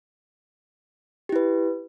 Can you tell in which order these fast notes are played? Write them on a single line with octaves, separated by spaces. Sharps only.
G4 E4 B4